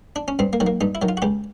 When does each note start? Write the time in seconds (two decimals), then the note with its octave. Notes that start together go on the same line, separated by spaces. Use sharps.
0.16 D4
0.28 C#4
0.39 G2 C4
0.53 A#3
0.60 D#3 F#3
0.67 A#3
0.81 G2 D#4
0.95 E4
1.02 D#3 F#3
1.09 F4
1.17 F#4
1.22 C#2 G4